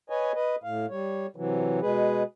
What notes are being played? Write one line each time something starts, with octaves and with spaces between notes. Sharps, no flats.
B4 C#5 D#5 G#5
B4 D#5
A2 F5
G3 C#5
C3 E3 F#3
B2 G#3 G#4 B4